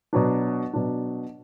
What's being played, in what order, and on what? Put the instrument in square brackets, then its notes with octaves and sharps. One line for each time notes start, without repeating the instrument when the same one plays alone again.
[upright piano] B2 F#3 B3 D4
B2 F#3 B3 D4